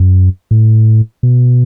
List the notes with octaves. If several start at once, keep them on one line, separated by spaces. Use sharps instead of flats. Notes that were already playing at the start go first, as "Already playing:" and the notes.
Already playing: F#2
A2
B2